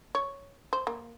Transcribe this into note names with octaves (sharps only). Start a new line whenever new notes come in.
C#5
C5
A#3